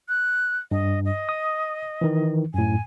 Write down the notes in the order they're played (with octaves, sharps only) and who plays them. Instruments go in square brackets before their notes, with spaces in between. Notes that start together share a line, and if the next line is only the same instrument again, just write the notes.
[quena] F#6
[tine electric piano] G2 [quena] D#5
[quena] D#5
[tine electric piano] D#6
D#3 E3
[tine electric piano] F#2 A2 [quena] G#5